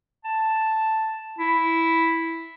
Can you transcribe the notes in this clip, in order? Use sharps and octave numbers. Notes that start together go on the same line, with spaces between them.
A5
E4